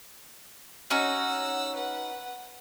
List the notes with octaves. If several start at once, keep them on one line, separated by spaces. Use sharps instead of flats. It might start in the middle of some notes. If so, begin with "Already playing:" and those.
C#4 D#4 F#4 F#5 E6
B4 F#5